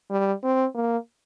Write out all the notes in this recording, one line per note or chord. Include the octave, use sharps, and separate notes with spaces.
G3
C4
A#3